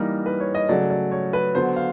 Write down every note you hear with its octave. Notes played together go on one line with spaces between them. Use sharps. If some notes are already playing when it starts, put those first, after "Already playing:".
Already playing: E3 G3 A#3 D#4 A#4
B4
C#5
D#5
C#3 F#3 A3 D5
D5
C#5
B4
D3 F#3 B3 C5
F5